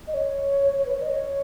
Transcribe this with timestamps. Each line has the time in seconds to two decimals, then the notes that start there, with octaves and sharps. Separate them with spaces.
0.07 D#5
0.14 C#5
0.78 C#5
0.86 B4
0.94 C#5
1.02 D#5
1.10 C#5